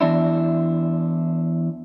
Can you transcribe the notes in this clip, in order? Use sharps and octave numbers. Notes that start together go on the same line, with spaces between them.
E2 D4 E4